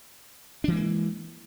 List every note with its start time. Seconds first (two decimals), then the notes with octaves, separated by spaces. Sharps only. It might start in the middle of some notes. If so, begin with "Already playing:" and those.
0.64 D4
0.68 E3
0.72 G#3
0.76 A#3